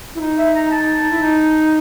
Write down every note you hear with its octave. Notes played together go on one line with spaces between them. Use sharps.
E4
D#4
E5
A#5
A5
E4
D#4